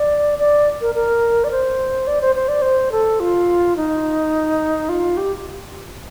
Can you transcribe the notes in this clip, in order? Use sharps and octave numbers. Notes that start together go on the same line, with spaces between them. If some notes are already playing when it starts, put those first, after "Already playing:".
Already playing: D5
D5
A#4
A#4
D5
C5
D5
C5
C5
D5
C5
A4
F4
D#4
F4
G4